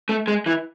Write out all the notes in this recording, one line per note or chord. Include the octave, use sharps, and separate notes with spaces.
A3
G#3
E3